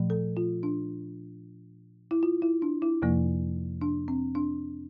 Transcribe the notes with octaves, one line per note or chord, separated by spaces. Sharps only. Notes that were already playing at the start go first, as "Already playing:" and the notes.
Already playing: A#2 F3 A3
A4
F4
D4
E4
F4
E4
D4
E4
F2 C3 F3 A#3
D4
C4
D4